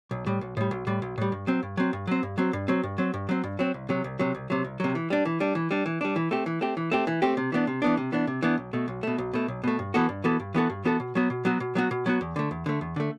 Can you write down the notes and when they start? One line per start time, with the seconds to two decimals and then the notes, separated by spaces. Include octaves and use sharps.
0.11 B1
0.26 A2 G3
0.41 B1
0.57 A2 G3
0.71 B1
0.87 A2 G3
1.02 B1
1.18 A2 G3
1.32 G2
1.47 F#3 C4
1.63 G2
1.77 F#3 C4
1.93 G2
2.07 F#3 C4
2.23 G2
2.38 F#3 C4
2.53 G2
2.68 F#3 C4
2.83 G2
2.98 F#3 C4
3.14 G2
3.29 F#3 C4
3.44 G2
3.59 F#3 C4
3.74 C2
3.89 C3 F#3
4.04 C2
4.19 C3 F#3
4.35 C2
4.50 C3 F#3
4.64 C2
4.80 C3 F#3
4.95 E3
5.10 G3 D4
5.25 E3
5.40 G3 D4
5.55 E3
5.71 G3 D4
5.86 E3
6.01 G3 D4
6.16 E3
6.31 A3 C4 G4
6.46 E3
6.61 A3 C4 G4
6.77 E3
6.92 A3 C4 G4
7.07 E3
7.22 A3 C4 G4
7.37 C3
7.52 E3 B3 D4
7.67 C3
7.82 E3 B3 D4
7.97 C3
8.12 E3 B3 D4
8.27 C3
8.43 E3 B3 D4
8.58 B1
8.73 B2 A3
8.88 B1
9.03 B2 A3
9.18 B1
9.33 B2 A3
9.48 B1
9.64 B2 A3
9.79 G2
9.94 E3 B3 F#4 A4
10.09 G2
10.24 E3 B3 F#4 A4
10.40 G2
10.54 E3 B3 F#4 A4
10.70 G2
10.85 E3 B3 F#4 A4
11.00 B2
11.15 F#3 B3 F#4
11.30 B2
11.45 F#3 B3 F#4
11.60 B2
11.75 F#3 B3 F#4
11.91 B2
12.06 F#3 B3 F#4
12.21 E2
12.36 D3 A3
12.51 E2
12.66 D3 A3
12.81 E2
12.96 D3 A3